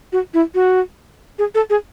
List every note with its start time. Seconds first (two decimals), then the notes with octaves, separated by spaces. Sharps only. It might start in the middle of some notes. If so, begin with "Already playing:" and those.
0.13 F#4
0.34 E4
0.55 F#4
1.39 G#4
1.55 A4
1.70 G#4